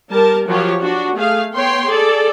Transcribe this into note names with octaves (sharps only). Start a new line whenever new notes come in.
G3 A#4 A5
F3 F#3 G4 C#5
D4 F#4
A3 G#4 F5
B3 C#5 G5 C6
G#4 A4 D5